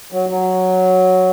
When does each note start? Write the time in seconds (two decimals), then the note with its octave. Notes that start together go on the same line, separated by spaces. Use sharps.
0.12 F#3
0.29 F#3